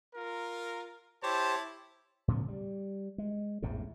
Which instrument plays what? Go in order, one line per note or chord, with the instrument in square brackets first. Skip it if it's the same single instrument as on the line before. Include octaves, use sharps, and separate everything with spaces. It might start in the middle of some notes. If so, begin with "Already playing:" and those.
[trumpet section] F4 A#4
[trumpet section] E4 C#5 A5 [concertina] G4 C5
[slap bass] A2 C#3 F3 B3
G3
G#3
A1 E2 G#2 C3